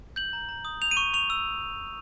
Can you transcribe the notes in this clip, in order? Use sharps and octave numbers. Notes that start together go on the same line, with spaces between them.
G6 F#7
A#5
A#5
D#6
G6 F7
D#7
C#6
C#6 F7
E6